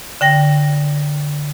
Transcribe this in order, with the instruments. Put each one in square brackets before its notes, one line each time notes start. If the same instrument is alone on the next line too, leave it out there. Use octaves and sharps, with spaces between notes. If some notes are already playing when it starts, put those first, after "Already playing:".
[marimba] D3 G5 A#6